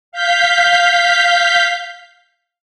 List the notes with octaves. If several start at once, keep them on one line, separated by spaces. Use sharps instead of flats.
F5 G6 B6